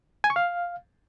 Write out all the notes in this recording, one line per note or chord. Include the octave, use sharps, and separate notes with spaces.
G#5
C#6
F5